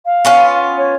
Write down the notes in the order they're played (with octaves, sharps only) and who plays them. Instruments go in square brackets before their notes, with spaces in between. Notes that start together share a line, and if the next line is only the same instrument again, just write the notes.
[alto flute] F5
[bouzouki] B3 C#4 F4
[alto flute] C#5